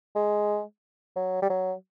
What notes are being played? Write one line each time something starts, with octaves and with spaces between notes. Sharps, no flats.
G#3
F#3
G3
F#3